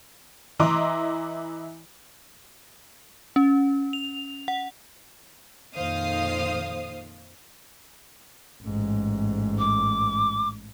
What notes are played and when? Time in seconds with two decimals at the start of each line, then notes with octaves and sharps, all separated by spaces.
0.60 E3 E4 D#5 A#5 C6 D6
3.36 C#4
3.93 F7
4.48 F#5
5.74 F2 A#2 D#3 C5 F5 D#6
8.63 A1 G#2
9.58 D6